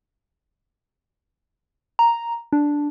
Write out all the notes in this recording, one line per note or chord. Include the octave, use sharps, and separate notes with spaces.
A#5
D4